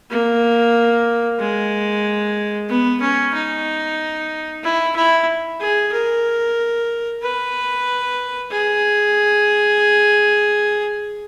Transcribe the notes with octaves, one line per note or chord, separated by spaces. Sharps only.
A#3
G#3
B3
C#4
D#4
E4
E4
G#4
A#4
B4
G#4